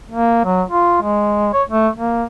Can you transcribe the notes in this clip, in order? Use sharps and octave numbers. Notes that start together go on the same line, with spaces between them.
A#3
F#3
F4
G#3
C#5
A3
A#3